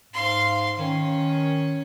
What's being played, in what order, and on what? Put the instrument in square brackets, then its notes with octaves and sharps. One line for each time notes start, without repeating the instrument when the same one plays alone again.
[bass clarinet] G#2 [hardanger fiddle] F5 C6
[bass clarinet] D#3 [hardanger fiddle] C#4